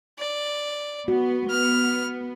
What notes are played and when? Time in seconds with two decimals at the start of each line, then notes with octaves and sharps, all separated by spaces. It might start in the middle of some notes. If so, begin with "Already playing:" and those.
0.19 D5
1.08 B3 F#4
1.50 B3 F6